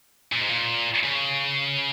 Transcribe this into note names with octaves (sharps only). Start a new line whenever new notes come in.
A#2
G#2
A#2
C#3